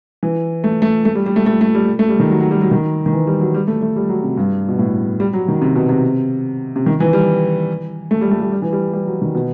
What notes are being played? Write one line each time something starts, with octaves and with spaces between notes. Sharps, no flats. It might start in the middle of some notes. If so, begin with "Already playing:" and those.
E3
A3
A3
A3
G3
G3
A3
A3
A3
G3
A3
G3
D#3
F#3
F#3
G3
F#3
D#3
D#3
E3
G3
F#3
G3
A3
A3
G3
F#3
C3
G2
B2
A2
G3
F#3
D#3
C3
B2
C3
C3
D#3
E3
G3
A3
G3
A3
G3
G3
E3
G3
G3
F#3
D#3
B2